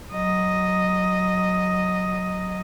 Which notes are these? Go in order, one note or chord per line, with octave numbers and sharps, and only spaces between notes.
F#3 D#5